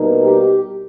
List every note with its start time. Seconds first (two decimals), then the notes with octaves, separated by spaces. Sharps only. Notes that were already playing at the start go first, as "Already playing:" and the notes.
Already playing: B2 G3 A#3 D#4
0.21 G4